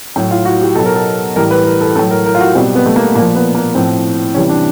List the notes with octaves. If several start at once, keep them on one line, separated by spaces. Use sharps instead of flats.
A2 F#3
F4
F#4
G4
B2 F#3 A4
A#4
A4
A2 E3 G3 A#4
B4
A#4
A4
A2 F#3 A4
A#4
A#4
F4
F#4
B2 G3 C4
B3
A3
A#3
A#2 F3 A#3
B3
A#3
A2 F3 C4
C3 E3 G3 C#4
D4